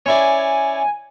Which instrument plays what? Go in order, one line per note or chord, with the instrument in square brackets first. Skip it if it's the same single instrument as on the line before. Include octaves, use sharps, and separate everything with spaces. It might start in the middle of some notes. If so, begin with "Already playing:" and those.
[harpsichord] C#4 E4 D5 [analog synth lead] G#5